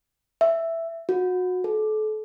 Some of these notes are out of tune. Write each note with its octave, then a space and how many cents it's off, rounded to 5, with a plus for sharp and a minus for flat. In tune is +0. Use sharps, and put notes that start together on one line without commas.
E5 +5
F#4 -25
A4 -35